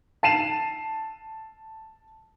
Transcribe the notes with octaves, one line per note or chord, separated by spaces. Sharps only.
A5 C7 D#7 E7